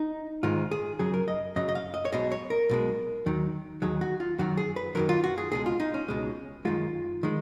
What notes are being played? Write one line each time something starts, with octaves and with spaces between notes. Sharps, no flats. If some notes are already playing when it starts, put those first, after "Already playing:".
Already playing: D#4
G#2 D#3 G#3 F4
G#4
F#2 C#3 F#3 G#4
A#4
D#5
F#2 C#3 F#3 D#5
D#5
F5
D#5
C#5
B1 B2 G#3 D#5
C#5
A#4
B1 B2 G#3
D#2 D#3 F#3
D#2 D#3 F#3 G#4
F#4
F4
F#2 D#3 F#3 F#4
G#4
B4
F#2 D#3 F#3 A#4
F4
F#4
G#4
C#2 B2 G#3 G#4
F4
D#4
C#4
C#2 B2 G#3
F#2 D#3 G#3 F4
D#3 G#3